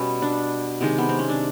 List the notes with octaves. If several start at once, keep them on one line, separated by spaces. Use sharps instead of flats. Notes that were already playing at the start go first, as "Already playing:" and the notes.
Already playing: B2 G3 B3 C#4
D4
C3 D#3 G#3
B3
C4
C#4
D4